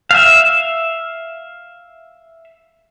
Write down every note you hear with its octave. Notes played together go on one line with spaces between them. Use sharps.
E5 F5